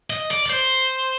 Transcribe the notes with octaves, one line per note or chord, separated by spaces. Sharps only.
D#5
D5
D5
C5